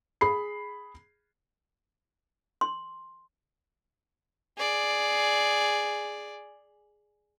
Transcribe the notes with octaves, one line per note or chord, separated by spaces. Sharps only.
G#4 B5 C7
C6
G#4 D5